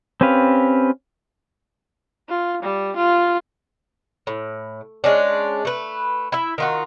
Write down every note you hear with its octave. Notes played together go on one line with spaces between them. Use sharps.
C4 C#4 G4 B4 F5
F4
G3
F4
A2
G#3 C#4 D4
A3 B4
E4 E5
D#3 F4 F#4